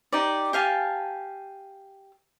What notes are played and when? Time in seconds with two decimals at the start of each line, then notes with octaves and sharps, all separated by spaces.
0.13 D#4 G4 D5
0.53 G4 F5 G#5 A5